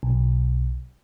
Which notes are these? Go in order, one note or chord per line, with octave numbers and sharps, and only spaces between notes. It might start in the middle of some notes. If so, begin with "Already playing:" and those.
B1